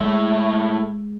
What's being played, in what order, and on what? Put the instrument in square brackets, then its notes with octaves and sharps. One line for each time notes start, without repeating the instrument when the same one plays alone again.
[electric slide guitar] A2 A3 E5 [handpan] G#3